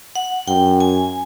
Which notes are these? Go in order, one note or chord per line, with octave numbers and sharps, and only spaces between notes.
F#5
F#2 G5
G#5